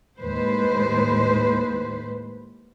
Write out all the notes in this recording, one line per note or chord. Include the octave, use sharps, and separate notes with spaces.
D#2 A2 G#3 B4 C5